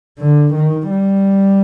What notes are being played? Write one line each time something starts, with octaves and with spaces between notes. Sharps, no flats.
D3
D#3
G3